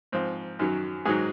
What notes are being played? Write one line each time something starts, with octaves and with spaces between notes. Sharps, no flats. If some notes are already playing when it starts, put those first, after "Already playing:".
G#2 F3 C4
F#2 D#3 F#3
G#2 D#3 F#3 G#4